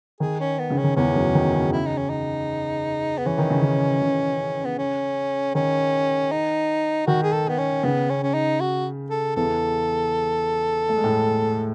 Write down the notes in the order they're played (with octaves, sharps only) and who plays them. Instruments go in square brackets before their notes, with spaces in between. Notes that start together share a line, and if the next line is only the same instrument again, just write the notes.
[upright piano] D#3 [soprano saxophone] G#4
[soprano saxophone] C#4
B3
[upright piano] C#3
[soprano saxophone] C#4
[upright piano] D#3
[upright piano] E2 E3 [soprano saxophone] C#4
[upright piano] F#2 F#3
D#3
C#3
[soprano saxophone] E4
D#4
C#4
D#4
B3
[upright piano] E3 [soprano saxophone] C#4
[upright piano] D#3
C#3
D#3
C#3
[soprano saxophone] B3
C#4
[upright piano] D#3 [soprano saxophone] C#4
[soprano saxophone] D#4
[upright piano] D#3 [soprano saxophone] F#4
[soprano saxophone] G#4
A4
B3
C#4
[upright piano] C#3 [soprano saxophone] B3
[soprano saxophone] C#4
C#4
D#4
F#4
A4
[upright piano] E2 E3 [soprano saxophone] A4
[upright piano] A3
G#3
A2 A3